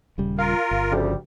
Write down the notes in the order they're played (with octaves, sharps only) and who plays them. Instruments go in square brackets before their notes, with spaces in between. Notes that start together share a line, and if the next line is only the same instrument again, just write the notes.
[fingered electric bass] D#1 C#3 G3
[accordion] F4 A#4 [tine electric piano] F5
[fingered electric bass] G1
[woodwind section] D2 G3 [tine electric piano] C#3 F3